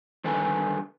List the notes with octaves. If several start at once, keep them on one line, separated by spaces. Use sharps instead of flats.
D3 D#3 G3 A4 B4 G#5